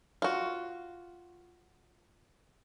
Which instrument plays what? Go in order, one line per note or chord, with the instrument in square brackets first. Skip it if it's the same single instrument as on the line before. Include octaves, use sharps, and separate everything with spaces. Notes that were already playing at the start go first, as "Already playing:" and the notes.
[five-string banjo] F4 F#4